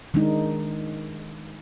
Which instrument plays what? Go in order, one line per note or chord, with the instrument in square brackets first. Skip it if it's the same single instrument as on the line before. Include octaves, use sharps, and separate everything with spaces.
[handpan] D#3 G#3 D4 D#4